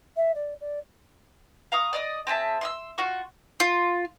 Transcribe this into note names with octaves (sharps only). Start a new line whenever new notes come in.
E5
D5
D5
F5 A#5 C#6 D#6
D5 D#5 D#6
C4 G#4 E5 A5
C6 D#6 E6
F4 F#4 C#6
F4